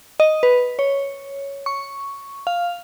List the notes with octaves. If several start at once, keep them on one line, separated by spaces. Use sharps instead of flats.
D#5
B4
C#5
C#6
F5